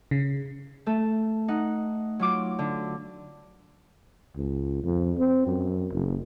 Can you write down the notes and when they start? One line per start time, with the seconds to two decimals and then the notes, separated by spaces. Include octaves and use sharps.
0.11 C#3
0.86 A3 A4
1.48 D#4 F#5
2.19 F#3 F4 D6
2.59 D3
4.35 C#2
4.84 F2
5.18 C4
5.47 F#2
5.92 F#1